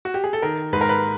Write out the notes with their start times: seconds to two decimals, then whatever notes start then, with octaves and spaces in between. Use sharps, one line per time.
0.05 F#4
0.14 G4
0.24 G#4
0.33 A4
0.42 D#3 A#4
0.73 G#2 B4
0.81 A#4
0.89 B4